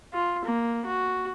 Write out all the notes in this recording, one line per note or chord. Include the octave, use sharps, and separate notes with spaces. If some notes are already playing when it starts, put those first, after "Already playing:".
F4
A#3
F#4